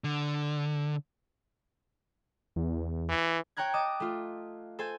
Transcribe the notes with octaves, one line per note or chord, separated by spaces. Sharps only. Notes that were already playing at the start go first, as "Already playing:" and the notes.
D3
E2
E3
C#5 G5 A#5 F#6 G#6
D#5 A5 D6 D#6
A3 F4
A4 C5 G#5